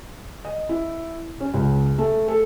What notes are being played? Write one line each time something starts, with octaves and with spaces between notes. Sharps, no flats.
D#5
E4
C#4
C#2
A3
A4